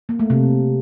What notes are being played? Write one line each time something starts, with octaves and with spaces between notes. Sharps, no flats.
A#3
A3
C3